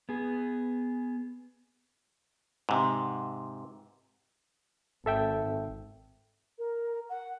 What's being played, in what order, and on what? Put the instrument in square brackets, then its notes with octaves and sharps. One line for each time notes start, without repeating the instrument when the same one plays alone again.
[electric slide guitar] B3 G#4
[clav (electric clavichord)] G#2 C3
[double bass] G#1 [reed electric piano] A4 E5 G5
[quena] A#4
F#5